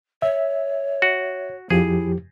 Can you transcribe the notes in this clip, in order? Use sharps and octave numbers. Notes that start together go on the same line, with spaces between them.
C#5 E5
F#4
F2 F3 E4 G4 G#4